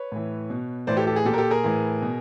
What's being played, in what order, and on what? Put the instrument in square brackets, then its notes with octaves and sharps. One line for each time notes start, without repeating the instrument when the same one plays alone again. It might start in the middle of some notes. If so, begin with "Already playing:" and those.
Already playing: [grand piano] B4 C#5
A2 E3
B2
A2 E3 C5 D5
G4 A4
G4 A4
G#4
A#2 G4 A4
A#4
G4 A4
G#4 A#4
A2 E3
B2